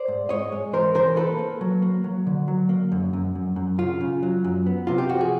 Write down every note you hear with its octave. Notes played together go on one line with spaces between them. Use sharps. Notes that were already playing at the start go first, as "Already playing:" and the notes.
Already playing: C5 D5
G#2
G#2 C#5 D#5
G#3
E3 A#4 C5
E3 A#4 C5
A#3 A4 B4
A#3
F#3
A#3
F#3
D3
F#3
A#3
F#2
F#2
F#2
F#2
C#3 F4
C#3
F#3
F#2
B3
C3 F4
G4
F3 F#4
G#4